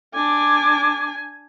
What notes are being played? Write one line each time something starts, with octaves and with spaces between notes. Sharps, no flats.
D4 G#5 D6